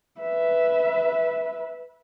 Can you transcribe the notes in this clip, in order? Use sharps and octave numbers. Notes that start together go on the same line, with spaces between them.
B4 E5